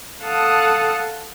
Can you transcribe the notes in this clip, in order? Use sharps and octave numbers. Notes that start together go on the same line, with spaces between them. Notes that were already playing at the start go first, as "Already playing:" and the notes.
A4 F5 F#5 A5 D#6